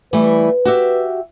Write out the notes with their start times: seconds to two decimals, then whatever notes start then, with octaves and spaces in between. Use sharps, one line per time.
0.13 E3 G3 A3 B4
0.65 F#4 G4 E5